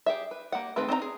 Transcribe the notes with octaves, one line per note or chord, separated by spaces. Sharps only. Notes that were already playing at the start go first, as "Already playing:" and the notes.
G4 G#4 E5
B4
A#3 G4 F#5
D#3 A3 C4 G#4 B4
C4 D#4 C#5 A#5
G#4